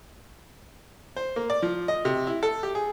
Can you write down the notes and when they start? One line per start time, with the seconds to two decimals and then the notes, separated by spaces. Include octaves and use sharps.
1.16 C5
1.36 A#3
1.50 D5
1.62 F3
1.88 D#5
2.05 C3
2.27 E4
2.43 A4
2.63 G4
2.75 G#4